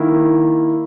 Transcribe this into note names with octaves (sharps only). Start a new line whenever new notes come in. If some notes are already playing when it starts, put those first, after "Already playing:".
Already playing: D#3 A#3 E4